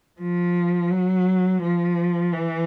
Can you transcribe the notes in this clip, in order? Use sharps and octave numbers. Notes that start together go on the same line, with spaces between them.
F3
F#3
F3
E3